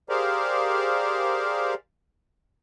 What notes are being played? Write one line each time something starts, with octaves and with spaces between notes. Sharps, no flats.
G4 G#4 A#4 C5 D5 F5